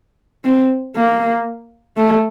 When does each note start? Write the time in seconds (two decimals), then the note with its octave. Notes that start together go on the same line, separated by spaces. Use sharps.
0.45 C4
0.96 A#3
1.97 A3